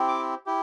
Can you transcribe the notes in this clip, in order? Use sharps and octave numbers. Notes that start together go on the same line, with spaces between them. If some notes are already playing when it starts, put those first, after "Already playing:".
Already playing: C4 E4 G4
D6
E4 G4